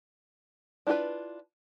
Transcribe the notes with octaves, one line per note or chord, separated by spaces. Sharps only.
D4 E4 F4 G#4 B4